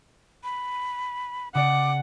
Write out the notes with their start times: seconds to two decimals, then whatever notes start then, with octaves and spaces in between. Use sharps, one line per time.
0.44 B5
1.55 C#3 D5 F#5 D6 C#7